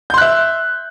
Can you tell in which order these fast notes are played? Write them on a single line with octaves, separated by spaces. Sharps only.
G6 C6 F#6 E5